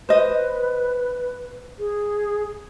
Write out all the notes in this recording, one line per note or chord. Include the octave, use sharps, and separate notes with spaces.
B4 C5 D#5
G#4